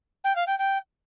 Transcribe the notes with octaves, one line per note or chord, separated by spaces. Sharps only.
G5
F5
G5
G5